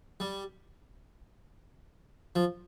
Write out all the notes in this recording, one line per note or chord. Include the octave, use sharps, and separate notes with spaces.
G3
F3